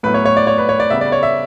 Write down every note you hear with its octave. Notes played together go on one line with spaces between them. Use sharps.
A2 F#3 B3 B4
C#5
C#5
D5
C#5
B4
C#5
D5
C#3 G3 B3 E5
D5
C#5
E5